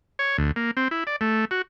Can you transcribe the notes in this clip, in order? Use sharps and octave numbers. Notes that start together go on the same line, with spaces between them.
C#5
D2
A#3
C4
E4
D5
A3
F#4